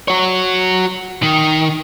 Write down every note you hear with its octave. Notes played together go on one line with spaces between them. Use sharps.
F#4 C#5
D#3